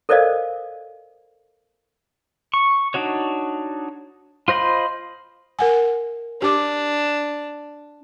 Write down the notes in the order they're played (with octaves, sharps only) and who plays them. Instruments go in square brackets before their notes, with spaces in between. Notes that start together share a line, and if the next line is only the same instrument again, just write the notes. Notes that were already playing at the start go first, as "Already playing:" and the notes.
[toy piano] A4 A#4 C5 D5 D#5 F5
[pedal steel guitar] C#6
D4 D#4 F#4 C#5
F4 C5 D#5 B5 C6
[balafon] A#4 F#5 G#5
[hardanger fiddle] D4 [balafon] G4 D6